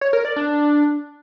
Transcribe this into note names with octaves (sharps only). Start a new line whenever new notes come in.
C#5
A#4
D5
D4